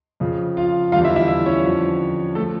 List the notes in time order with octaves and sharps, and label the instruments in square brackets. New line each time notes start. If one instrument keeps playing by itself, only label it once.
[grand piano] F2 C#3 F3
F4 F5
E2 D3 G3 F4 F5
E4 E5
E4 E5
E4 E5
C#4 C#5
F2 D3 F3
A3 A4
F3